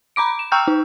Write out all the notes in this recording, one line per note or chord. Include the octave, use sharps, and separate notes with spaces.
A#5 B5 D6 D7
E7
G5 A#5 C#6 E6 F6 G6
D#4